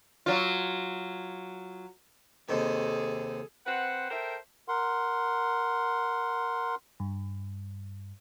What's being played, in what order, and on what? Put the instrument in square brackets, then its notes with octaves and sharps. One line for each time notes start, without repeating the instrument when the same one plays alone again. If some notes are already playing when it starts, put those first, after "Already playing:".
[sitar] F#3 F4
[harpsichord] D#2 C3 D#3 [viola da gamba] G#4 A4
[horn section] C4 B4 C5 F#5
A4 A#4 C5 E5 G5
[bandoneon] A#4 F#5 C6
[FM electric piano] G2